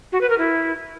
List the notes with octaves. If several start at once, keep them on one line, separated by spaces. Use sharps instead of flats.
F#4
B4
A#4
E4